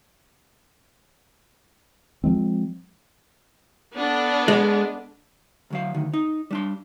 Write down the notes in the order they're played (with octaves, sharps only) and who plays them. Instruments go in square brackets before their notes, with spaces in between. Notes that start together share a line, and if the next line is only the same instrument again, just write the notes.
[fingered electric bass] F3 F#3 G#3 C4
[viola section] B3 D4 A4
[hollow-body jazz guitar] G#3
D2 F#3 F5
D2 D#3
D#4
G3 D4 C6